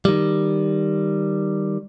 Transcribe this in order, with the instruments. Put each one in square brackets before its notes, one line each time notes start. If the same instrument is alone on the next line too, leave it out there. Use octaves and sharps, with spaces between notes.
[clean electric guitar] D#3 G3